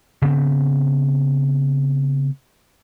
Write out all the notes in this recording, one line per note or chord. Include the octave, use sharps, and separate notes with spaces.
C#3 B3 C4